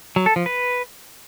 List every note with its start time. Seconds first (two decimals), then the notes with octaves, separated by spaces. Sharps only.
0.16 F#3
0.26 A4
0.36 F3
0.46 B4